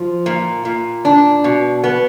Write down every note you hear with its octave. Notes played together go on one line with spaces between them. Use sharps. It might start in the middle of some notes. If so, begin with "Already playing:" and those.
Already playing: F3
A#2
A#2
D4
B2
B3